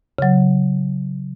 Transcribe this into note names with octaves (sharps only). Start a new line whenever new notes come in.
C#3 F#3